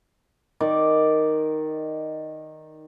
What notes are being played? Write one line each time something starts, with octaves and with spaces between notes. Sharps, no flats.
D#3 A#4 D5